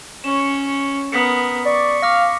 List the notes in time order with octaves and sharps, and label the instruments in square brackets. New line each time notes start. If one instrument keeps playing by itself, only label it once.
[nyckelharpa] C#4 C#5 [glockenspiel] E7
[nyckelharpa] B3 A#4 [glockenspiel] D#6 B6 C#7
[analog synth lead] D5 [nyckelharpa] C#6
[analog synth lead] F5 [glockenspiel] D6 F6 A#6